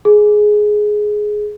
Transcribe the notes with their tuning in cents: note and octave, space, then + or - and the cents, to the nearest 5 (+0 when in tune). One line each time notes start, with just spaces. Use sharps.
G#4 +10